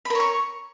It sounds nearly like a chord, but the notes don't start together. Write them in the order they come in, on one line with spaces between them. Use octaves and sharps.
B5 A#4 C#5 C#6